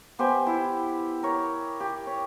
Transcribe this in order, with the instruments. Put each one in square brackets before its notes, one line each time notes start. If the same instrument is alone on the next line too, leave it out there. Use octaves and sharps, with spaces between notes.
[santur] B3 G4 C5 G#5
E4 G4
A#4 C#5
G4
C#5